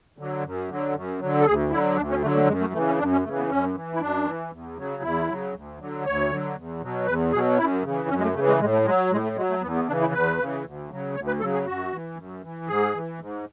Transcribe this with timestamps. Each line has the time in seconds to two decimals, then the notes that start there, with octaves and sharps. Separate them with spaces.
0.18 D3 F#3
0.44 F#2
0.70 D3 F#3
0.94 F#2
1.20 D3 F#3
1.40 A4
1.46 D2 G#4
1.71 D3 F#3 E4
1.96 D2 D4
2.10 C#4
2.22 D3 F#3 A3
2.36 A3
2.47 F#2 G#3
2.60 A3
2.73 C#3 E3 A3
2.86 C#4
2.99 F#2 D4
3.12 C#4
3.24 C#3 E3 A3
3.38 B3
3.49 F#2 C#4
3.75 E3
3.93 E4
4.00 F#2 D4
4.26 E3
4.52 E2
4.77 C#3 F#3
5.03 E2 E4
5.29 C#3 F#3
5.53 D2
5.80 D3 F#3
6.05 D2 C#5
6.30 D3 F#3
6.56 E2
6.81 B2 F#3
7.06 E2 B4
7.32 B2 F#3 G#4
7.58 F#2 E4
7.83 C#3 E3
8.09 F#2 C#4
8.18 G#3
8.22 A3
8.34 C#3 A3
8.39 E3
8.47 G#3
8.60 A2 G#3
8.73 A3
8.85 F#3 G#3
9.11 A2 G#3
9.24 A3
9.36 F#3 G#3
9.50 A3
9.62 E2 B3
9.75 B3
9.88 C#3 E3 D4
10.01 E4
10.13 E2 B4
10.38 C#3
10.43 E3
10.64 D2
10.90 C#3 F#3
11.15 D2 C#5
11.27 B4
11.40 C#3 F#3 A4
11.54 G#4
11.66 F#2 F#4
11.92 E3
12.17 F#2
12.43 E3
12.68 G#2 G#4
12.94 E3
13.20 G#2